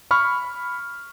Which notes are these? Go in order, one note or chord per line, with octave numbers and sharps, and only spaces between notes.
B5 C#6 F6